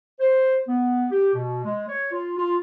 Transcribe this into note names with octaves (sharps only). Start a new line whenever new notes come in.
C5
B3
G4
B2
G#3
C#5
F4
F4